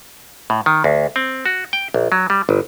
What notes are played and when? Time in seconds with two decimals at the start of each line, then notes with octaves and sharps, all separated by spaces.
0.50 A2
0.66 D#3
0.84 D2
1.16 C4
1.46 F#4
1.73 G5
1.94 A#1
2.12 F#3
2.30 G3
2.49 G1